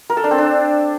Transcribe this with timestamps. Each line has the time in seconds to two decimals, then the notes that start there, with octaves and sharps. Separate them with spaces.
0.10 A#4
0.17 A4
0.24 D4
0.31 C4
0.38 D4